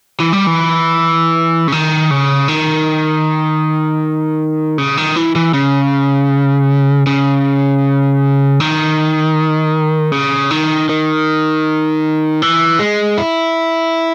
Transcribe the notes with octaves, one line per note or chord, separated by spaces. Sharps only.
E3
G3
E3
C#3
D#3
C#3
D#3
C#3
D#3
E3
E3
C#3
C#3
D#3
C#3
D#3
D#3
E3
G#3
E4